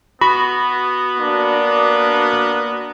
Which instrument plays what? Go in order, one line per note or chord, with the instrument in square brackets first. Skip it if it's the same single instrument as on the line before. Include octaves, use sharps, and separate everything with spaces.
[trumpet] B3 [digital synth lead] F#4 [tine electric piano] B5
[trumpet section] A#3 D4